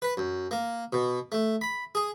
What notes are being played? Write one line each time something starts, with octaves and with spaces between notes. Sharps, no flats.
B4
F#2
A#3
B2
A3
B5
G#4